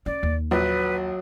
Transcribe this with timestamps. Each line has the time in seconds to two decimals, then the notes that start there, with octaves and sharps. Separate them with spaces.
0.06 C#4 D5
0.23 D#2
0.51 A#1 F#3 B4